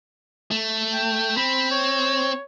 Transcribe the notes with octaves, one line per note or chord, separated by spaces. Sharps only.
A3
G5
C4 B5
C#5